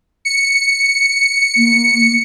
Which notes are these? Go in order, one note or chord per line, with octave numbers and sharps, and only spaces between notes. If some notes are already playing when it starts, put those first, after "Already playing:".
C#7
A#3